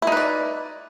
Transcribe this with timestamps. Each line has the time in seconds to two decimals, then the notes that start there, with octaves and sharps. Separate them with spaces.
0.02 E4
0.07 D#4
0.12 B4
0.17 D5